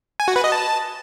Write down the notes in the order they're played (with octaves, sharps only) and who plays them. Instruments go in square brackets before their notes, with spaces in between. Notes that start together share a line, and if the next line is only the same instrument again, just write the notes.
[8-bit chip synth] G#5
F#4
B4
D#5
A5